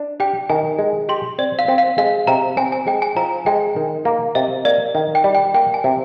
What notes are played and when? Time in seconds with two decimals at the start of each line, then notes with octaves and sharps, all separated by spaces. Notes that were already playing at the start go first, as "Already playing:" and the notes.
Already playing: D4
0.20 G4 G5
0.49 D#3 G#5
0.79 G#3
1.09 G4 C6
1.38 C4 D5
1.59 F5
1.68 C4
1.78 F5
1.98 G#3 F5
2.27 C3 A#5
2.57 C4 G#5
2.72 G#5
2.87 G#3 G5
3.02 G#5
3.16 F3 A#5
3.46 G#3 G5
3.76 D#3
4.05 A#3
4.35 C3 D#5
4.65 A#3 D5
4.95 D#3
5.15 G5
5.24 G3
5.35 G5
5.54 A#3 G5
5.74 G#5
5.84 C3